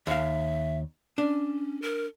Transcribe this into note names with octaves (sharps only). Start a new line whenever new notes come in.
D#2 E5 F5
C#4 D4
A#4